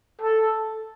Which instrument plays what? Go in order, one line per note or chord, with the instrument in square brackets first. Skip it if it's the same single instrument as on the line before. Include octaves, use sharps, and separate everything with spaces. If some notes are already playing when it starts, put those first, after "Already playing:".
[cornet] A4